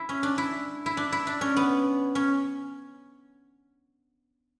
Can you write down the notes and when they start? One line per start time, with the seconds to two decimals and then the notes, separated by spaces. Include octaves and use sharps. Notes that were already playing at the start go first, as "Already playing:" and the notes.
Already playing: E4
0.09 C#4
0.23 D4
0.38 E4
0.86 E4
0.97 D4
1.12 E4
1.27 D4
1.41 C#4
1.57 B3
2.15 C#4